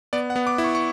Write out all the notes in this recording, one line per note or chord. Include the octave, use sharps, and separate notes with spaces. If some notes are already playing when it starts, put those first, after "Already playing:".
B3 D5
F#5
B3
D6
E4
C#6
C#6